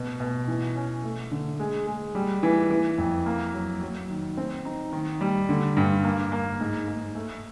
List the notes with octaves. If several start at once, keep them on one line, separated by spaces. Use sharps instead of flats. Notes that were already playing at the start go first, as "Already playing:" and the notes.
Already playing: B2
B2
E3
C#4
A3
D3
G#3
G#3
G3
E3
E3
F2
A#3
F#3
F#3
D#3
C4
D#4
D#3
G3
D3
G2
A#3
A#3
G#2
G#2
A3